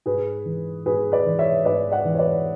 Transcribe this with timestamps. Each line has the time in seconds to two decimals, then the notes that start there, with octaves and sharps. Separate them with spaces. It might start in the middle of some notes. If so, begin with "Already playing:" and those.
0.06 G#2 G#4 B4
0.45 E3
0.86 G#2 G#4 B4
1.12 B4 D5
1.26 E3
1.39 C#5 E5
1.65 G#2 B4 D5
1.92 D5 F#5
2.05 E3
2.14 C#5
2.18 B4 D5